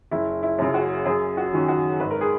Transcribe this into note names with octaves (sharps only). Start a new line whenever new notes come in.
F#1 E4
E4
F#2 C#3
F#4
F#2 G#4
F#4
D#3 F#3 C#4
F#4
G#1 B4
A#4
G#4